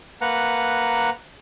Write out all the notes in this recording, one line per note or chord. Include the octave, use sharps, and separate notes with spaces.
A#3 B4 F#5 A#5